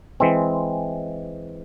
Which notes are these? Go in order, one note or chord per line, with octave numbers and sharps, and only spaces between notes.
E3 G#3 C4